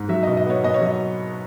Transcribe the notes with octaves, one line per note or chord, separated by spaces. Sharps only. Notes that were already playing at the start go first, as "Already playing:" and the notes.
Already playing: G#2
F#3 E5
B2 D#5
D#5
B3 C#5
B2 D#5
C#5
F#3 D#5